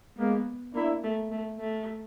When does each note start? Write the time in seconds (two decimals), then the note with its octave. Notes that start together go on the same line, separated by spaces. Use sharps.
0.18 G#3 A#3 B3
0.75 A#3 D4 E4
1.04 A3
1.32 A3
1.60 A3